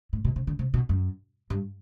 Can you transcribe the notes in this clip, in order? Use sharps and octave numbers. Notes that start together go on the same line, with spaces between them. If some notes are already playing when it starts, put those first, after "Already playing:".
A2
B2
C3
D3
C3
B2
F#2
G2